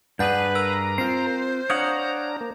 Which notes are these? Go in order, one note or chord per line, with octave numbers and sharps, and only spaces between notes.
G2 D4 G#4 B4 F#5 G6
A#4 A#5 E6
C4 F4 C5 C7
D4 C#5 F5 F#5 A#5 D#6
A#3